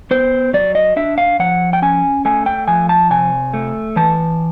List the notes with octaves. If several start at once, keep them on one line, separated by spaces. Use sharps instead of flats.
B3 C5
F#3 D5
D#5
D4 E5
F5
F3 F#5
G5
C#4 G#5
A3 G#5
G5
F3 G#5
A5
C3 G#5
A3
E3 A5